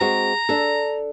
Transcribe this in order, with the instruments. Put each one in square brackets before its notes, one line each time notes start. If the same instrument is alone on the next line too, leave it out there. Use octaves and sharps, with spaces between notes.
[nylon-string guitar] G#3 C4 F#4 [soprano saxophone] A#5
[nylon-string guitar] D4 A4